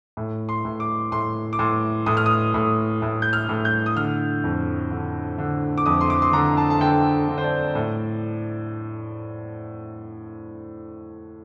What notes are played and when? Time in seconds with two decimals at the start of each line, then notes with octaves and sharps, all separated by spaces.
0.17 A2
0.49 C6
0.65 A2
0.80 D6
1.12 A2 C6
1.53 D6
1.59 A2 C6
2.06 A2 D#6
2.17 F6
2.26 D#6
2.54 A2
3.02 A2
3.22 G6
3.33 F6
3.49 A2
3.65 G6
3.86 D#6
3.96 D3 F6
4.44 F2
4.91 D3
5.38 D3
5.78 D6
5.86 F2 D#6
6.01 C6
6.10 D6
6.22 C6
6.33 D3 A#5
6.57 A5
6.70 A5
6.80 D3 G5
7.28 D3
7.38 C5
7.44 D5
7.75 A2